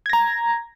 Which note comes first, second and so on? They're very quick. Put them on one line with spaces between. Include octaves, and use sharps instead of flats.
G#6 A#6 A#5